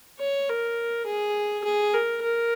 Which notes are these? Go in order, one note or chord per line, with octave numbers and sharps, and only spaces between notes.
C#5
A#4
G#4
G#4
A#4
A#4